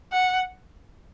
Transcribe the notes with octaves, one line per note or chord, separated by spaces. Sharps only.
F#5